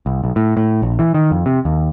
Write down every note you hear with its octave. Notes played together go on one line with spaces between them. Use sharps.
C2
B1
A2
A2
A#1
E3
D#3
F2
C3
D#2